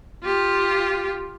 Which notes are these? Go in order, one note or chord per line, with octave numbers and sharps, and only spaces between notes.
F4 G4